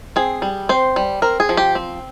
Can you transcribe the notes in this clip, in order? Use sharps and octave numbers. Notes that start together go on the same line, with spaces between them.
C4 G#4
G3
C4 C5
G3
C4 A#4
G#4
F3
G4
C4